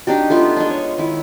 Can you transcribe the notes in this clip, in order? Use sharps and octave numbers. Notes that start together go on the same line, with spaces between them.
D4 D#4 F#4 G4
A3 B3 F4
G#3 D4
C#5
D#3 E4